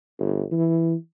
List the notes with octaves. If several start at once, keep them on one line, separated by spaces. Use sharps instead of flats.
G1
E3